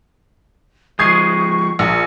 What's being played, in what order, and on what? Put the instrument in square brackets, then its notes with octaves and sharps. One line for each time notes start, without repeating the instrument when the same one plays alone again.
[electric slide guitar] F3 G#3 [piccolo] C#6 [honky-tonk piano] D#6 G#6 C7
[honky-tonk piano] A#1 [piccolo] C#7